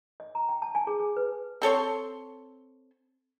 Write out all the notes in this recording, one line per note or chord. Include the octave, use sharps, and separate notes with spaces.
D#5
A#5
G5
A5
G#5
G#4
G#4
B4
C4 A4 C#5 C6